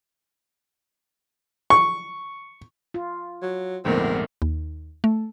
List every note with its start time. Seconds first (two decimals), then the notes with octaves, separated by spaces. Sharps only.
1.70 C#6
2.94 F4
3.43 F#3
3.85 A#1 F2 G#2 D3 A3 B3 C4 A#4
4.42 D#2
5.04 A3